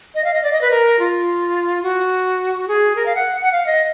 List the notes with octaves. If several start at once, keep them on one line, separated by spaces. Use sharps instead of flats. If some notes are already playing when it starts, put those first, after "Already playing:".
D#5
F5
D#5
D5
D#5
B4
A#4
F4
F#4
G#4
A#4
F5
F#5
F#5
F5
D#5